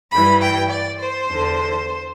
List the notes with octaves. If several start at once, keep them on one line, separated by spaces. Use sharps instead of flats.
G2 E3 B5
G5
D5
C5
E2 D3